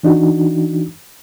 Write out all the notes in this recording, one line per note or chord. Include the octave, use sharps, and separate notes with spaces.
E3 D4 D#4 F#4